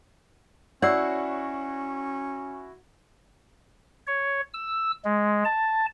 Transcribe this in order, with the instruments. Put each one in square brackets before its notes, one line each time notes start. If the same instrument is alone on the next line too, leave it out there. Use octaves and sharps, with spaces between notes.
[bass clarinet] C#4 [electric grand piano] E4 F#4 C7 [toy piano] C#5 D5 E6 [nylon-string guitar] F#5
[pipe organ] C#5
E6
G#3
A5